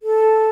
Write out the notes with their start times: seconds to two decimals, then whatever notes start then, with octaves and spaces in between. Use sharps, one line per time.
0.03 A4